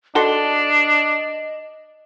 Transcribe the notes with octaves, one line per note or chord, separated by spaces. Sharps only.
D4 F#4 A4 D#5 C6